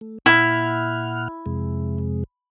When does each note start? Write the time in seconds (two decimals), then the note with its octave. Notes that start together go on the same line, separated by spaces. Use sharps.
0.01 A3
0.26 A#2 E4 F#5 F6
1.46 F2 C3 G#3